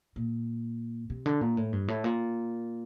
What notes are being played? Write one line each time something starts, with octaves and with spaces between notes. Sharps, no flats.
A#2
C3
D3
A#2
A2
G2
A2
A#2